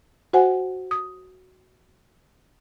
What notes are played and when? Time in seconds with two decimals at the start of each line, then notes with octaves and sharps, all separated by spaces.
0.33 F#4 C5 F#5 G#5
0.91 D#6